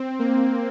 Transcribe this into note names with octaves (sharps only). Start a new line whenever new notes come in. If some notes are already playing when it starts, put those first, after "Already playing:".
Already playing: C4
A#3